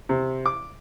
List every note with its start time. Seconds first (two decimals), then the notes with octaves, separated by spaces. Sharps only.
0.09 C3
0.46 D6